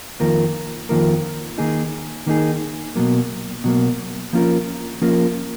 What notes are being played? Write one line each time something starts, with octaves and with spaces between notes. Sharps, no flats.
F2 D#3 A#3 F4 A#4
F2 D#3 A#3 F4 A#4
D#3 A#3 D#4 G#4
D#3 A#3 D#4 G#4
B2 F#3 A#3
B2 F#3 A#3
F3 A#3 C#4 F4 A#4
F3 A#3 C#4 F4 A#4